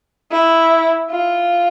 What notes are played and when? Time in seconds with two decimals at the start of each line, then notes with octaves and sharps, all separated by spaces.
0.31 E4
1.11 F4